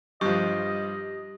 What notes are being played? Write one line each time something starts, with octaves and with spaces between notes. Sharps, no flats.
G2 F3 G4 D#5